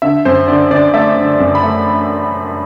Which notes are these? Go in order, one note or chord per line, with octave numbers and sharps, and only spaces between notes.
D3 E5
F#2 C5
D3 D5
D3 D5
A3 E5
D3
F#2
B5
A3